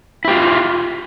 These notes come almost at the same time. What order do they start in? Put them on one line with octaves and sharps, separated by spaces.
E4 G4 F4